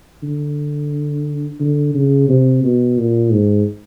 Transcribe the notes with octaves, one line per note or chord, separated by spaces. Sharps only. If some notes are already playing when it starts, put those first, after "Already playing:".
D3
D3
C#3
C3
B2
A#2
G#2